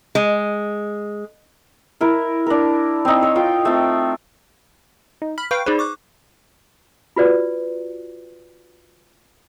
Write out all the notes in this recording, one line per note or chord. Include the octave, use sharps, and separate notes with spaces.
G#3
E4 A#4
D4 A#4
C4 D#4
C#5
F4 G5
A3 C4
D#4
B5 F6
B4 F5 G5 C#6
D#4 G#4 B4 C5 D5
C#6 D6 F#6
F4 F#4 B4 D5